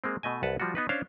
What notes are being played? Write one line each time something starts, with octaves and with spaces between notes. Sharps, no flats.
G#3 A#3 C4
B2 A3 D#5 G#5
C2 B4 F#5 A5
F3 G3 F4 F#4
B3 D#4 B4
C#4 D4 C5 C#5 F5